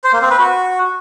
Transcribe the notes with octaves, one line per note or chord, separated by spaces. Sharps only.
C5
A#3
C4
B4
F#4